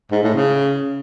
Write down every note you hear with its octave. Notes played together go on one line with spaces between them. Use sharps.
G#2
A2
C#3